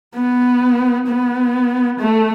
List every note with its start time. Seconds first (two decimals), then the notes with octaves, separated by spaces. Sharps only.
0.15 B3
1.07 B3
2.00 A3